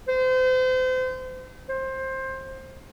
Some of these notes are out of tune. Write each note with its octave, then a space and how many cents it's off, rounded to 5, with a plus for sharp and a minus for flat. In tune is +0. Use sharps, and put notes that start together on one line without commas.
C5 -35
C5 +20